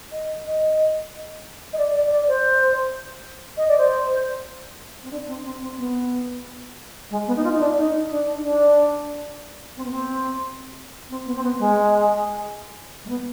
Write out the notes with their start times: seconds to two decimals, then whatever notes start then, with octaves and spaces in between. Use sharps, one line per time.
0.12 D#5
0.45 D#5
1.73 D#5
1.78 D5
1.94 D5
2.11 D5
2.28 C5
3.57 D#5
3.68 D5
3.78 C5
5.02 C4
5.11 D4
5.27 C4
5.43 C4
5.60 C4
5.77 B3
7.10 G#3
7.27 B3
7.36 D#4
7.44 F4
7.52 D#4
7.60 D4
7.77 D#4
8.10 D4
8.37 D#4
8.43 D4
9.76 C4
9.84 B3
9.91 C4
11.09 C4
11.26 B3
11.36 C4
11.43 B3
11.59 G#3
13.05 G#3
13.09 B3